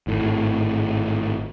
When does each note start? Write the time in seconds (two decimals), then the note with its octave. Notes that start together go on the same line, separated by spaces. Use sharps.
0.07 G#1 A2